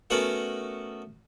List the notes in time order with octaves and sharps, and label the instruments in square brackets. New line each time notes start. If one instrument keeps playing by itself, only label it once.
[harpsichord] A3 B3 C#4 F#4 A#4 F#5